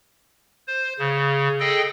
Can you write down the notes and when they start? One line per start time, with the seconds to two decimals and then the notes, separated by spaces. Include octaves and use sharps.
0.67 C5
0.99 C#3
1.60 G#4 A4 D#5 G5